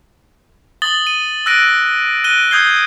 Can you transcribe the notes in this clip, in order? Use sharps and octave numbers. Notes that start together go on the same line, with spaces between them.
D#6 A6 F#7 G7
D#7
E6 F#6 A#6 D7 D#7
F#6 D7 D#7 G7
D#6 G6 G#6 C7 G7